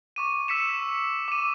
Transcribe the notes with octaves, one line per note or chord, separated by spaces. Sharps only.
C#6 D6 D#7
E6 B6 C#7 E7
D6 D#7